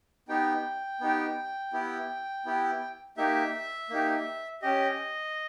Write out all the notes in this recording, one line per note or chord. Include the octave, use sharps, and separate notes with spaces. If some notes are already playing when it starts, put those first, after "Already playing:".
B3 D#4 G4 G5
B3 D#4 G4
B3 E4 G4
B3 E4 G4
A#3 D#4 G4 E5
A#3 D#4 G4
C#4 G4 D#5